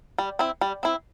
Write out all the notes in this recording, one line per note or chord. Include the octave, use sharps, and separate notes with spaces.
G3
C4 E4
G3
C4 E4